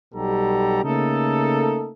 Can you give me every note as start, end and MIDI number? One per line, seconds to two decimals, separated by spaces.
0.13 0.80 35
0.13 0.80 47
0.13 0.80 55
0.13 0.80 67
0.13 0.80 69
0.13 0.80 82
0.83 1.91 49
0.83 1.91 57
0.83 1.91 58
0.83 1.91 63
0.83 1.91 69